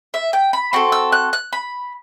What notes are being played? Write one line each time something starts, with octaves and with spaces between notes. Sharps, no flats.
E5
G5
B5
C4 F#4 A4 C6
E6
F#6
F#6
B5